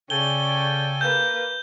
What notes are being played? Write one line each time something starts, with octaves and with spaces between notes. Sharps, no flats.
C#3 C#4 A4 D5 G5 G#5 G7
A#3 B4 G6